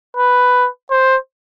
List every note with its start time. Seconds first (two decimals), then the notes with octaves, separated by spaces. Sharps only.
0.17 B4
0.91 C5